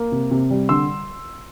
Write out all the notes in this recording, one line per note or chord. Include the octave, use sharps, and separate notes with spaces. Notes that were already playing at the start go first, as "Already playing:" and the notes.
Already playing: A#3
C3
C3
G3
D3 C6 E6